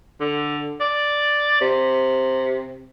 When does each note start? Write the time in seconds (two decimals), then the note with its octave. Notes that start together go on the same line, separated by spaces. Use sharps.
0.20 D3
0.81 D5
1.61 C3